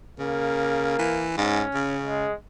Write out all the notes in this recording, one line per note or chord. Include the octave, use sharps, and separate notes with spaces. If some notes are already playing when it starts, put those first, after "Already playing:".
C#3 A#3
E3
G#2 C#4
C#3
G#3